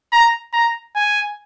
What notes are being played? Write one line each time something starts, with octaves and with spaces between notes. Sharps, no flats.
A#5
A#5
G#5